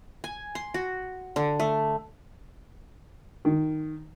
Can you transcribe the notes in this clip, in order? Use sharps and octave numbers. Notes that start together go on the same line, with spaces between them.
G#5
C6
F#4
D3
A3
D#3